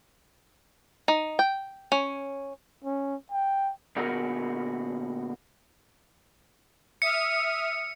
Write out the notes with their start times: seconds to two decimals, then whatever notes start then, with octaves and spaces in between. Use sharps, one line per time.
1.08 D#4
1.39 G5
1.92 C#4
2.84 C#4
3.32 G5
3.96 A#2 D3 B3 F#4 G#4 A#4
7.02 E5 D#6 F6 C#7